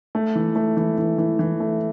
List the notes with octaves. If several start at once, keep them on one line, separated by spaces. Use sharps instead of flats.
A3
E3
A3
E3
E3
E3
E3
A3